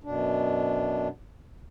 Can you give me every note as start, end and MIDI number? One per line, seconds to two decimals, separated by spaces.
0.04 1.08 42
0.04 1.08 47
0.04 1.08 62